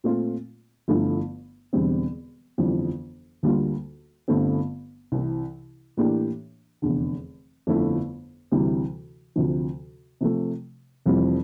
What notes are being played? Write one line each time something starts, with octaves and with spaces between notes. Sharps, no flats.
A#2 A3 C4 F4
G1 G2 F3 A3 E4
E1 E2 D3 G3 C4
G1 F2 E3 G3 D4
D2 D3 G3 A#3 F4
G1 G2 D3 A3 C4
C2 C3 E3
A2 E3 A#3 D4 G4
F1 E2 D3
G1 F2 D3 A3 E4
D2 C3 E3 G3
D2 C3 F3
C3 F3 A3
F1 F2 E3 G3 C4